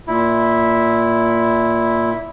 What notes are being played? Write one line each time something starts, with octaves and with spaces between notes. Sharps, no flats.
A#2 E4